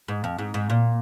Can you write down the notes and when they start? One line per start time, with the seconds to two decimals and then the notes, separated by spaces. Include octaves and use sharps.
0.08 G#2
0.24 F2
0.39 G#2
0.54 G#2
0.70 A#2